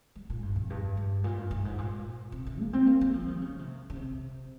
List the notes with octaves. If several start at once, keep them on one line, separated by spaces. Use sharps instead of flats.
G3
A#2
G2
F2
G2
G2
A#2
G2
G2
G#2
A#2
C3
C3
A#3
C4
A#3
G3
F3
D#3
C#3
C3
C#3
C3